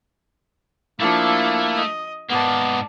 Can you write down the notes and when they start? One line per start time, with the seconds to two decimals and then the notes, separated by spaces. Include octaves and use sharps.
1.00 F3 A3 A#3 D4 E4
1.75 D#5
2.30 G#2 A#3 B3 D5 A5